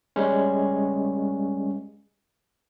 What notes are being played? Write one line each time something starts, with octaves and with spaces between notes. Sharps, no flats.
G3 G#3 C#4